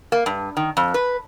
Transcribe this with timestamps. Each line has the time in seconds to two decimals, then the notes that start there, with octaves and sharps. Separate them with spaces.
0.12 A#3
0.26 G2
0.57 D#3
0.77 F2
0.94 B4